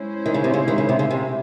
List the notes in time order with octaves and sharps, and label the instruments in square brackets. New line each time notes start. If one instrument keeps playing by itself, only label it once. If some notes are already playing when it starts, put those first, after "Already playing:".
Already playing: [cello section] G#3 C#4 E4 C5
[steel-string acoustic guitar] D#3
C#3
C3
C#3
D#3
C#3
C3
C#3
C3